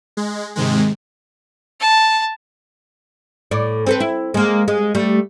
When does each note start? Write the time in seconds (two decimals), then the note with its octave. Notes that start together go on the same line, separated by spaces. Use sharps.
0.17 G#3
0.56 G#2 C3 D#3 G#3
1.80 A5
3.51 A2 D5
3.87 C4 A4 B4
4.00 E4
4.34 G#3 A#3
4.68 G#3
4.95 G3 A3